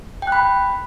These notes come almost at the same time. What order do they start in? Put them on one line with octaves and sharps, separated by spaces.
G5 F#6 B5